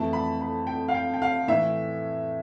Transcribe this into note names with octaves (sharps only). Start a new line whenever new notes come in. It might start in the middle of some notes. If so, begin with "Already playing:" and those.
Already playing: F2 E3 A3 A5
B5
B5
G5
F5
G5
G5
F5
A2 E3 A3 E5